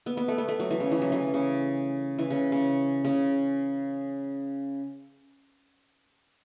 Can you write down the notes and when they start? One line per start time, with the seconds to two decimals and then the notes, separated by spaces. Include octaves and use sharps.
0.06 B3
0.17 B3
0.28 A3
0.38 B3
0.48 A3
0.60 F#3
0.71 E3
0.80 C#3
0.91 E3
1.01 F#3
1.12 E3
1.34 C#3
2.19 E3
2.30 C#3
2.52 C#3
3.05 C#3